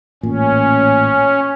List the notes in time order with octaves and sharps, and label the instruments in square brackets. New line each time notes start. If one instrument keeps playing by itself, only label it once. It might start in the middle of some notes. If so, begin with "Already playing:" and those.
[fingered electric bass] A1 A#2 [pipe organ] C#4